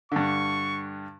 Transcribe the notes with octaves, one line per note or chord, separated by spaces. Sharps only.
G2 D3 C#6